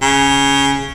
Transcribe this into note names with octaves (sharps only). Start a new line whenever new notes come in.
C#3